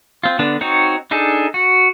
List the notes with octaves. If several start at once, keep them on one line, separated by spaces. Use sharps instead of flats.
C4 F4
D3 B3 D4
C4 D#4 F#4 C#5
D4 D#4 G#4 A4
F#4